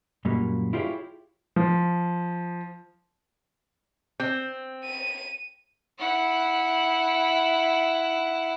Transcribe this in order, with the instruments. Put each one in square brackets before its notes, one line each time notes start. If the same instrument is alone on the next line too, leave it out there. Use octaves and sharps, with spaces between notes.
[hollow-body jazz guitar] F#2 A#2 F#3 G3 A#3
E4 F4 G4 G#4 B4 C#5
[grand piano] F3
[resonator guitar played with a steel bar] C4
[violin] D#7
[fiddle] E4 F#5